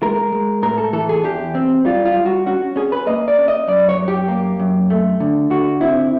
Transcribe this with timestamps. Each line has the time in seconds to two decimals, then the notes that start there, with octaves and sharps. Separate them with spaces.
0.02 G#3 A#4
0.32 G#3
0.62 A2 A#4
0.78 A4
0.93 E3 A4
1.09 G#4
1.24 E2 G4
1.55 C4
1.85 G3 F4
2.05 F4
2.16 G3
2.25 F#4
2.46 C#4 F#4
2.76 C#4 G#4
2.92 B4
3.07 A#3 D#5
3.28 D5
3.38 C#4
3.48 D#5
3.68 F#2 D5
3.89 C#5
3.98 F#2
4.08 G4
4.28 A#3
4.59 F#2
4.90 A3
5.20 D3
5.50 D3 F#4
5.81 C4 E4